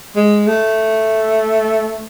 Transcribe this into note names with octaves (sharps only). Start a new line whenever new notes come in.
G#3
A3